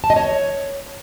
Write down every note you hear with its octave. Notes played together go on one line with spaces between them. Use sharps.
A5
D#5
C#5